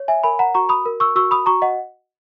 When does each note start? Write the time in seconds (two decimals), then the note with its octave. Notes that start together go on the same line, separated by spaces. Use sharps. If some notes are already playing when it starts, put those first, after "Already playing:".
Already playing: C#5
0.08 E5 G#5
0.23 A#4 G#5 B5
0.39 F#5 A#5
0.54 F#4 A#5 C#6
0.69 B5 D#6
0.86 A#4
1.00 C#6 E6
1.16 F#4 C#6 E6
1.31 B5 D#6
1.46 F#4 A#5 C#6
1.62 D#5 F#5